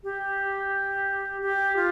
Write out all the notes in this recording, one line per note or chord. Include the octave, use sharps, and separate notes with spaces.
G4
G4
F4